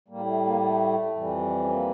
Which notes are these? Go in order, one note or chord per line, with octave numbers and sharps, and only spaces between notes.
A2 G3 A#3
A3
A#3
A3
F2 E3 G3
C#4
A#3